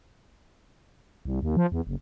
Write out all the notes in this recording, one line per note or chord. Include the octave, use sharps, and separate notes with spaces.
C2
D#2
F3
E2
F#1